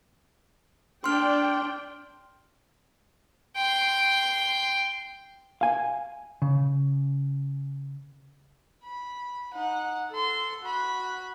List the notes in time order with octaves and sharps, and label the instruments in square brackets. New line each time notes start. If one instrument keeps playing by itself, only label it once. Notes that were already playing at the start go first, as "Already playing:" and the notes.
[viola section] D4 G5 [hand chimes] C6 F6
[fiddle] G5 C6
[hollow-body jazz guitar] F5 G#5
C#3
[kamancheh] B5
D#4 F#5
A4 C6
F#4 B5